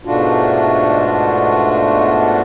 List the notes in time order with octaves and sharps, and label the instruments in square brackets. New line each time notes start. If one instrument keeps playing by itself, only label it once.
[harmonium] G#2 B2 A3 D4 F4 F#4